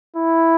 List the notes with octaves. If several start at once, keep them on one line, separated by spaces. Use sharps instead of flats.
E4